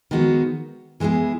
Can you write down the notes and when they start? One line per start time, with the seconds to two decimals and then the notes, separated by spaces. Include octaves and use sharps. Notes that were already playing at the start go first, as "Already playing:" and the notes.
0.11 D#3 G#3 B3 F#4
1.00 E3 G#3 B3 E4 G#4